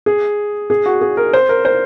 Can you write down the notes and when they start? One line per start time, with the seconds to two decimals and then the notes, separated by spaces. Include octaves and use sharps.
0.06 G#4
0.70 G#4
0.86 F#4
1.01 G#4
1.17 A#4
1.33 C5
1.49 A#4
1.65 C5